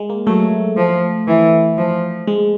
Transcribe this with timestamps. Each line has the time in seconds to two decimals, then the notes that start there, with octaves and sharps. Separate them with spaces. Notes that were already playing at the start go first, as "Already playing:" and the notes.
Already playing: G#3
0.10 A#3
0.26 F#3 A3
0.77 F3
1.28 E3
1.77 F3
2.27 G#3